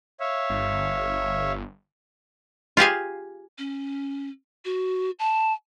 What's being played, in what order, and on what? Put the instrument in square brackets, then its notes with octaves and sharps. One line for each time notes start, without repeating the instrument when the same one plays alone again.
[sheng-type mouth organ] C#5 E5 F5
[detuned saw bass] G1
[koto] F4 G4 G#4 F5
[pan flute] C#4
F#4
A5